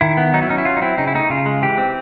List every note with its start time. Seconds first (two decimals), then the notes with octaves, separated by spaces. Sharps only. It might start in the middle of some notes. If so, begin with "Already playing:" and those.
0.01 D#3 E4
0.17 B3
0.33 F#3 D#4
0.42 E4
0.49 C#4 D#4
0.58 E4
0.65 F#3 F4
0.77 D#4
0.82 C4 E4
0.98 C#3 D#4
1.07 E4
1.14 A3 D#4
1.30 C#3 F4
1.46 G#3
1.62 E3 G4
1.78 C4